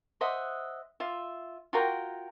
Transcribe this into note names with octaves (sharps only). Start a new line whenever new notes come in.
C5 D#5 E5 F#5
F4 E5
F4 F#4 A#4 G5